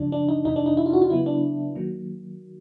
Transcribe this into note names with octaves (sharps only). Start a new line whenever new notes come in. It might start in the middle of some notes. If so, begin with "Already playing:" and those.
Already playing: F#2 C#3 F3 D4
D4
D#4
F2 C3 E3 D#4
D4
D#4
E4
F4
F#4
F4
C#3 F#3 B3 E4
D4
D#3 F#3 A#3